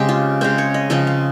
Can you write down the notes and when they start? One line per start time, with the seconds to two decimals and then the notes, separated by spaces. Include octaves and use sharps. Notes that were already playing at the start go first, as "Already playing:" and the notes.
Already playing: C#3 G#3 C4 G4
0.09 F4
0.41 C#3 G#3 C4 C5
0.58 C#5
0.74 D#5
0.90 C#3 F3 G#3 C4 D#5
1.07 F5